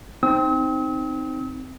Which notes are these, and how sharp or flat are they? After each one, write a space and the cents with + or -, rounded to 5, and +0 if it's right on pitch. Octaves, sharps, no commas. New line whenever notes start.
C4 +0 D#4 +0 E6 -45